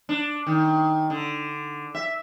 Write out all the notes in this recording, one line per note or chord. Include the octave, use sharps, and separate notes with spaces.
D4
D#3
D3
E5